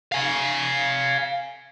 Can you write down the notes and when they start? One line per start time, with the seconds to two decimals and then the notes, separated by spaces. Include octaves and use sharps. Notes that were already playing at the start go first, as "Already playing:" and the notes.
0.12 F5 G#5